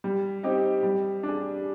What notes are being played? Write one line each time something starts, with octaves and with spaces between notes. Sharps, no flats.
G3
C4 D#4 G4
G3
D4 G#4